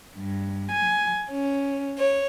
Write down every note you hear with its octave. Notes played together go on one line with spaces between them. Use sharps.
G2
G#5
C#4
C#5